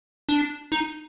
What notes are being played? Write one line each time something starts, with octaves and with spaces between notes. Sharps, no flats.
D4
D#4